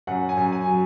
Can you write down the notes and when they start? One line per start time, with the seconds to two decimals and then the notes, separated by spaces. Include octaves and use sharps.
0.07 F#2 F#5
0.29 G#5
0.37 F#2
0.52 G#5
0.67 F#3